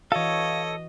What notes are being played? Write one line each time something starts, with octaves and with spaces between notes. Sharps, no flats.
E3 F#4 A4 C#5 D#5 F5